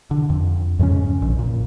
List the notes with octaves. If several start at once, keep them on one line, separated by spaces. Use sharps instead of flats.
D3
F2
F2 G#2 C#3 C#4
A#1
A#2